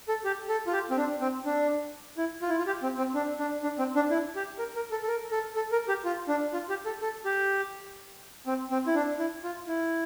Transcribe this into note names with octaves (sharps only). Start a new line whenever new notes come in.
A4
G4
A4
F4
G4
C4
D4
C4
D4
E4
F4
E4
F4
G4
C4
C4
D4
D4
D4
C4
D4
E4
G4
A#4
A#4
A4
A4
A#4
A4
A4
A#4
G4
F4
D4
F4
G4
A4
A4
G4
C4
C4
E4
D4
E4
F4
E4